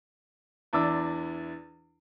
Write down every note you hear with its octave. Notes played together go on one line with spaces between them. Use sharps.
E2 D4 E4 D6 E6